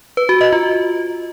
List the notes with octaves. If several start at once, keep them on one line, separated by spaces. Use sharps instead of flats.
B4
F#4
D#5
F4